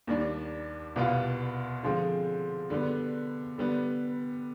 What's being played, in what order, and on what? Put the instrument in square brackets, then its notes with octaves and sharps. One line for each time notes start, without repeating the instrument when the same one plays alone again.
[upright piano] D#2 D#3 G3 D4
C2 B2 B3 F4
D3 F3 G#3 C4
D3 G3 B3
D3 G3 B3